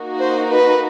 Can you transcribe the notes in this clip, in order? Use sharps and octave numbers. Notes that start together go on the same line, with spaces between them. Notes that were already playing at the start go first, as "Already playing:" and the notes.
Already playing: A#3 D#4 F#4
C5
B4